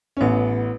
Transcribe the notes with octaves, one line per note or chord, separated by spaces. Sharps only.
C#4
A1 B3